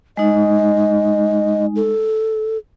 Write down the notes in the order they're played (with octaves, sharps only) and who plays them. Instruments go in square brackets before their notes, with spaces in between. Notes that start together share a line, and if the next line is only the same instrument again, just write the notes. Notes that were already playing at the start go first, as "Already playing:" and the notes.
[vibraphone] G#3 D#4 [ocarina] D#5
[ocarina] A4